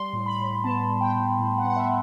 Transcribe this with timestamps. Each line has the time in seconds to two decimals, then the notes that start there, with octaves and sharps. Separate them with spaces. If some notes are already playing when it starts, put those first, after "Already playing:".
Already playing: G3 C6
0.13 A2
0.26 B5
0.39 A2
0.64 B3 A5
0.89 G3
1.01 G5
1.14 A2
1.39 A2
1.58 F#5
1.64 B3
1.70 F#5
1.76 E5